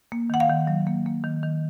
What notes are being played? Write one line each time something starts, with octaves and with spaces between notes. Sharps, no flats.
A#3
D#3 F#5
F5
D#3
F#3
A#3
A#3
D#3
D#3